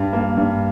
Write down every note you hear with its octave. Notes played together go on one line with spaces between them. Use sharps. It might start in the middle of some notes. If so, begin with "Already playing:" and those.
Already playing: G2
A#3
G2